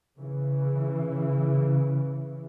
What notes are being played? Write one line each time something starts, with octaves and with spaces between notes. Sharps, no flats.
C#3 E3